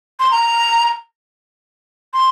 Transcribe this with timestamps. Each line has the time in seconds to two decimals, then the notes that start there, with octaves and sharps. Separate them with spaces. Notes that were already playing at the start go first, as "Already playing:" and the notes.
0.20 C6
0.31 A#5
2.14 C6